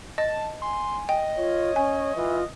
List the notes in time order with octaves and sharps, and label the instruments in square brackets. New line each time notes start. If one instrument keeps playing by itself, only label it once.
[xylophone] D#5 [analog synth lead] A5
[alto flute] G#5 [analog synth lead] C6
[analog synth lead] D#5 [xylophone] G5
[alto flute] F4 [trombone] C#5
[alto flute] C#4 [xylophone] G#5
[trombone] E3 [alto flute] F4